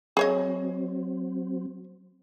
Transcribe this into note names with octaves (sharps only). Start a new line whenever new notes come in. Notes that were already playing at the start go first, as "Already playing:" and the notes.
F#3 C4 G#4 C#5 D#5